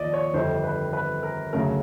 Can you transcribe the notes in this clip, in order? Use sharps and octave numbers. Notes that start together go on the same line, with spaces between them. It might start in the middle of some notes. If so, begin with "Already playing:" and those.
Already playing: D#2 F3 D5 D#5
C#5
G1 F2 D3 G3 C5
B4
B4
A#4
D2 C#3 F#3 A3 A#4